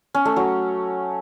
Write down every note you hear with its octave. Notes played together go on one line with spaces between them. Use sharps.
C#4
A3
F#3